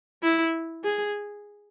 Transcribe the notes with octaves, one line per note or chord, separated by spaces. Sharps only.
E4
G#4